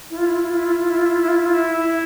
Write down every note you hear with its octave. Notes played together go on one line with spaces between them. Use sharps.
E4
F4
E4
F4
E4
F4
E4
F4
E4
F4
E4
F4
E4
F4
E4
F4
E4
F4
E4
E4